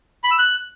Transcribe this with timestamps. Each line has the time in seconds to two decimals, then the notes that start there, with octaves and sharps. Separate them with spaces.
0.24 B5
0.31 E6
0.39 F#6